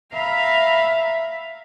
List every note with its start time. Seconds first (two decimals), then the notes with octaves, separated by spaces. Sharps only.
0.12 E5 F5 A#5 B5